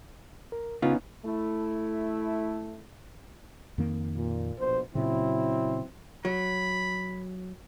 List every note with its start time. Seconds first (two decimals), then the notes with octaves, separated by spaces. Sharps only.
0.52 A#4
0.82 C#3 B3 C#4 D#4 F4
1.25 A3 E4
3.78 F2 D#3 A#3
4.17 A#2
4.59 A#1 B2 C5
4.95 A#2 C#3 F#3 C4 E4
6.25 F#3 B5